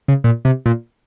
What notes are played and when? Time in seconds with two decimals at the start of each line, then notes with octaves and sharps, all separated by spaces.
0.08 C#3
0.24 A#2
0.45 C3
0.66 A#2